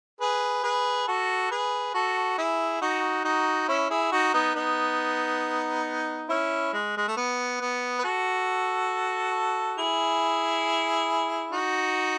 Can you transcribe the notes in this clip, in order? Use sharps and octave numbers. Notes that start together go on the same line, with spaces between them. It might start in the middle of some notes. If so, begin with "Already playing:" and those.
G#4 B4
G#4 B4
F#4 A4
G#4 B4
F#4 A4
E4 G#4
D#4 F#4
D#4 F#4
C#4 E4
E4 G#4
D#4 F#4
B3 D#4
B3 D#4
C#4 E4
G#3
G#3
A3
B3
B3
B4
F#4 A4
E4 G#4
D#4 F#4